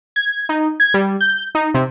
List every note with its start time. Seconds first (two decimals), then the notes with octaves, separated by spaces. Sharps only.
0.16 G#6
0.49 D#4
0.80 G#6
0.94 G3
1.21 G6
1.55 D#4
1.74 C3